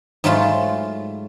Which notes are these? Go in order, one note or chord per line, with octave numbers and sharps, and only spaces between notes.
G#2 F#3 A3 F4 A5 B5